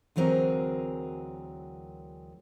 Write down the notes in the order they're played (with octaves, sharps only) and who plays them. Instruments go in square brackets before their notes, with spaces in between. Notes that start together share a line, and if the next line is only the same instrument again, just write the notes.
[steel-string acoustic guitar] D2 E3 F#3 C4 G#4 A#4